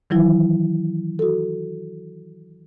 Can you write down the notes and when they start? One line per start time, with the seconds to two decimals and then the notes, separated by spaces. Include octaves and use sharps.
0.10 D#3 E3 F#3 E4
1.19 F#4 A4